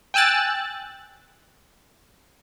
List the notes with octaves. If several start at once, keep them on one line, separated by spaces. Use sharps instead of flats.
G5 G#5 E6 F#6 A6